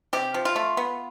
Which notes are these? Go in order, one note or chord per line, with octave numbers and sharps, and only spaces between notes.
C3 G4
F3
F4
A3
B3